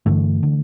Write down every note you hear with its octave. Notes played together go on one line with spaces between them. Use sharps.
G2 D3 E3 A3
D3